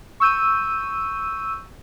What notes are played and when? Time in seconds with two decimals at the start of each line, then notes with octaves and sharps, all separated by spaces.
0.20 C#6 E6 G6 D#7